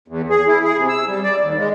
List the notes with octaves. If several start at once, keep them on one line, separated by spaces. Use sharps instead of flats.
E2
G#4
E4
G#4
C3
E6
G3
D5
D#2
G#3